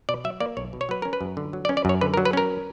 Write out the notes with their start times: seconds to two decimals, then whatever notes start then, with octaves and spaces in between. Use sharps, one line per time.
0.09 B2 D5
0.24 F#3 E5
0.40 A#3 D5
0.57 B1 C#5
0.73 B2
0.81 C#5
0.89 F#3 B4
1.02 C#4 A#4
1.13 B4
1.21 F#2
1.37 D3
1.53 F#3
1.65 D5
1.69 C#4
1.77 D5
1.85 F#2 C#5
2.01 D3 B4
2.14 A#4
2.17 F#3
2.25 B4
2.33 C#4 A#4